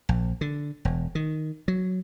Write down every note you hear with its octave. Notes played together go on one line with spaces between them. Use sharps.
A#1
D3
E1
D#3
F#3